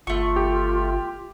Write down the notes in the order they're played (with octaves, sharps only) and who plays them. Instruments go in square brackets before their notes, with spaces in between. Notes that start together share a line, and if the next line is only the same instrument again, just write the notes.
[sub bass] G1 [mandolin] A3 C#6 [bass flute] F4
[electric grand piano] G4